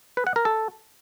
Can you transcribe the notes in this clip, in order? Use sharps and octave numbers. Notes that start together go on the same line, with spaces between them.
B4
F#5
A#4
A4